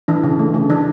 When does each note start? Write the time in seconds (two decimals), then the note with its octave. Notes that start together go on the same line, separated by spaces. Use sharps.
0.08 E3 D4
0.24 C#3
0.39 A3
0.54 C#3
0.70 E3 D4